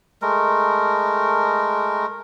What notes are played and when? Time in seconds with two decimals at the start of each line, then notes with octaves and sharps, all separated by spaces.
0.22 G#3 A3 A#4